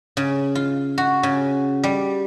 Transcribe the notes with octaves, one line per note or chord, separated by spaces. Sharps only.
C#3
F4
F#4
C#3
G3